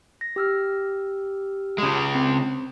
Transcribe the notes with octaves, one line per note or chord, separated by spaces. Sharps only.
A#6
G4 E6 F6
C#3 G#3
C4